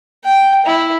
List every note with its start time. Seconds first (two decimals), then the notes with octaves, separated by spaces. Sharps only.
0.25 G5
0.66 E4